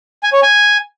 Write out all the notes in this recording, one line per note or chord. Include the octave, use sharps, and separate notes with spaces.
G#5
C#5
G#5